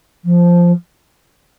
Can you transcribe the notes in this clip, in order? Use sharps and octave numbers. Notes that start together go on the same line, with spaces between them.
F3